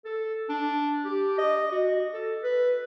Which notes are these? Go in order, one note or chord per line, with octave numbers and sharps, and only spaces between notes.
A4
D4
G4
D#5
F#4
A4
B4